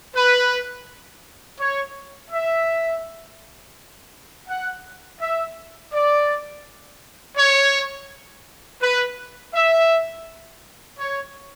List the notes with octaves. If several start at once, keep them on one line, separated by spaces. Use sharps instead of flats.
B4
C#5
E5
F#5
E5
D5
C#5
B4
E5
C#5